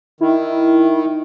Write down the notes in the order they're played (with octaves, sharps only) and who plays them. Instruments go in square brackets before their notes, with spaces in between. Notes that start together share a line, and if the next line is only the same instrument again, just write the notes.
[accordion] D#3 [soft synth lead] E4